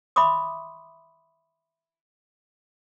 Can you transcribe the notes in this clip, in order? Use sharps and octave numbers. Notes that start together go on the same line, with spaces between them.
E5 B5 C6 D6 D#6